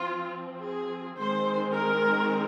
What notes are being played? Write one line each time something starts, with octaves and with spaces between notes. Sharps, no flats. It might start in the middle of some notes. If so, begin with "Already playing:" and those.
Already playing: F3 C4 F4
G#4
D#3 G#3 C4 C5
A#4